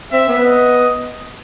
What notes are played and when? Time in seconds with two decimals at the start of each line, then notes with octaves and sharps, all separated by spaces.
0.12 C4 E5
0.29 B3
0.46 D#5